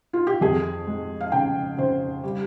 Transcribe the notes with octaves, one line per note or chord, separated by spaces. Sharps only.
F4
G4
F2 G#4
G#3
F5
C#3 G5
C#3 C5
G3